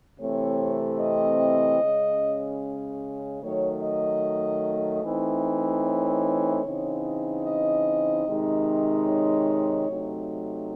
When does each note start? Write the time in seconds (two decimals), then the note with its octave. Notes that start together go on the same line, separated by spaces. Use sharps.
0.20 C3 E3 A3 C4 C#5
1.01 D#5
1.81 C#3 G#3 C#4
3.42 D#3 F#3 A3 C#5
3.83 D#5
5.04 E3 A3 C4 D#4
5.85 C#5
6.65 C#3 E3 C4 D#4
7.46 D#5
8.26 C3 D#3 G#3 D#4
9.07 C#5
9.88 C3 F#3 A3 D#4